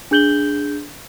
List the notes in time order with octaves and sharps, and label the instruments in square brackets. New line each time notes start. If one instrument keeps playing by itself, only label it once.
[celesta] D4 G#4 G6 F#7 G7